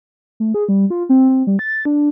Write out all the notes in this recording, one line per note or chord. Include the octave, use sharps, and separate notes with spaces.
A3
G#4
G3
F4
C4
C4
G3
A6
D4